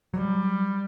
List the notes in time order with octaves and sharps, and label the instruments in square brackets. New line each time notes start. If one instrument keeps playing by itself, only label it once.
[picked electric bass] F#3 [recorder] G3